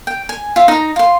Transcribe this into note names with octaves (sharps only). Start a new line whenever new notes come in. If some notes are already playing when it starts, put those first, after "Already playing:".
G5
G#5
F4 E5
D#4 A#5
F4 C6